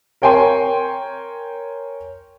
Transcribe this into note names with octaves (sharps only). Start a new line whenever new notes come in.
A#4 C#5 G5 G#5 C6